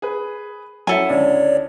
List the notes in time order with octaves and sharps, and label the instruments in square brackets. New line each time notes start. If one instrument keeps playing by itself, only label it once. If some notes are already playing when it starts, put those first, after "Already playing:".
[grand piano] G#4 B4
[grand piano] F#2 F#3 [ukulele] E4 A4 G#5 [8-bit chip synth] F#5
[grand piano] C#2 D3 [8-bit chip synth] C#5 D5